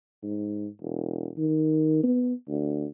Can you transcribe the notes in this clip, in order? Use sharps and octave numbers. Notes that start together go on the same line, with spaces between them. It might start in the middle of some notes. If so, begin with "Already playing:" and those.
G#2
E1
D#3
B3
D2